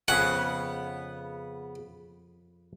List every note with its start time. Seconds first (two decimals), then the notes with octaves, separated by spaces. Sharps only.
0.08 F2 C#3 B3 C#4 G#4 F#5